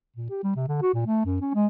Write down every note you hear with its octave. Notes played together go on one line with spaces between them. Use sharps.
A#2
G4
G3
C3
D3
F#4
A#2
A3
F#2
C#4
G#3